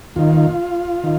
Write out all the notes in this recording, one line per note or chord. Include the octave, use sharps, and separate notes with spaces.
D#2 D#3 F4
D#3